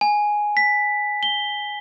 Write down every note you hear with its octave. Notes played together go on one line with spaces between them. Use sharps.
G#5
B6
G7